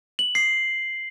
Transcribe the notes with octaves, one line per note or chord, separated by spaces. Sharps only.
F#7
C7